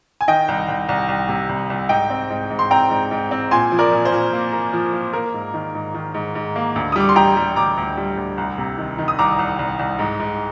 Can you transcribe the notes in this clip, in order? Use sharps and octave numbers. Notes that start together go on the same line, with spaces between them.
G#5
D#3 D#5 G5
C2
C2
C2
C2
C3
C2
C2
G#2 D#5 G5
C4
G#2
G#2
C6
C4 G5 A#5
G#2
G#2
C4
A#2 G#5 C6
F3
A#4 D5
A#2
C5
A#2
A#3
A#3
F3
A#3
A#3 A#4
G#2
D#3
G#2
D#3
G#2
G#2
A#3
D2
D#6
G3 D6
C6
G3 G5 A#5
G3
D2 A#5 D6
D2
G3
D2
C2
C3
D#3
D#3
D#6
C2 A#5 D6
C2
C2
C2
G#2
G#2